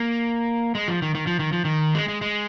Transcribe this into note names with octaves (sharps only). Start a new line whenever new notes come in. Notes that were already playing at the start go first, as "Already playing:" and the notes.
Already playing: A#3
G#3
F3
D#3
D#3
F3
D#3
F3
D#3
G#3
G#3
G#3